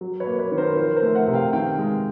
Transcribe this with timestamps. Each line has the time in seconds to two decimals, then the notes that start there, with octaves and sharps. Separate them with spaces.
0.01 F#3
0.20 B4 C#5
0.27 A#3
0.39 B4 C#5
0.52 D#3
0.58 A#4 C5
0.77 F3 A#4 C5
0.96 A#4 C5
1.02 A3
1.15 E5 F#5
1.27 C3
1.34 F5 G5
1.53 D#3 F5 G5
1.78 G#3